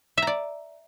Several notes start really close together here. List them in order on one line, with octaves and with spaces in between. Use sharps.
E5 A#5 D5